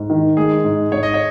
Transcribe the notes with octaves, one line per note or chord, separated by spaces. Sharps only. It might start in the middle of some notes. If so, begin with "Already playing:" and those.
Already playing: G#2
D#3
G#3 G#4
G#2
G#2 C#5
D#5
C#5